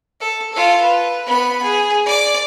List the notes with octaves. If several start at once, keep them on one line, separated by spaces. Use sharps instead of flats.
A4
F4 A4
B4
B3 B5
G#4
D5 D6